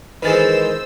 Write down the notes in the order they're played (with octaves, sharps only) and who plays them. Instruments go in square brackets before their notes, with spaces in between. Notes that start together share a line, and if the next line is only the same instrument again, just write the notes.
[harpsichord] D#3 E3 G#3 [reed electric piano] B4 A6 [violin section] C5 E6